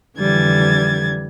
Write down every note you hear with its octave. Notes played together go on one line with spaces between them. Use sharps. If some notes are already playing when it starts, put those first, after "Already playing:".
F2 D3 E3 G3 G#6 A6